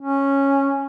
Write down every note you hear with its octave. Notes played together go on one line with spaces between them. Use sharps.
C#4